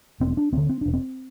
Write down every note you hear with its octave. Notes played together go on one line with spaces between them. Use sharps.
E1 C4
C4
D4
D2 D3 C4
C4
E1 D4
C4